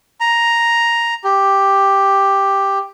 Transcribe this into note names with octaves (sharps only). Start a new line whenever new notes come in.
A#5
G4